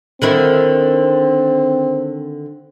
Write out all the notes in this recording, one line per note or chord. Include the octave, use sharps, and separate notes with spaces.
D3 D#3 C4 E4